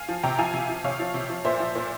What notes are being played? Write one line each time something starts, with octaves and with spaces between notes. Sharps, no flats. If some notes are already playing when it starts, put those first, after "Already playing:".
Already playing: F5 G#5
F3
C3 G5 A#5
F3 F5 G#5
C3
F3
C3 C#5 F5
F3
C3
F3
A#2 C5 E5
F3
A#2